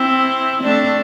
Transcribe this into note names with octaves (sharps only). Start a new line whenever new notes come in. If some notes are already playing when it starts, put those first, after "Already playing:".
Already playing: C4 E4
A3 D4